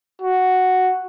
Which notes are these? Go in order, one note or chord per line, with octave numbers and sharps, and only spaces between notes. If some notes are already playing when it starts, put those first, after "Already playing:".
F#4